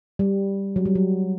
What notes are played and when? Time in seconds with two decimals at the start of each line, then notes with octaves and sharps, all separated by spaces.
0.19 G3
0.76 F#3
0.85 G3
0.95 F#3